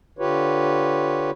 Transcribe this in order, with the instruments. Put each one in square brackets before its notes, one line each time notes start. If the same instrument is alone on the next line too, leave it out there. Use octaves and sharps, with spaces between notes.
[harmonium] D3 F4 G4 B4 C#5